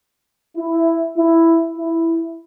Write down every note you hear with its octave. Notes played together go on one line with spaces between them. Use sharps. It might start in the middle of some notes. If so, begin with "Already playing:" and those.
E4
E4
E4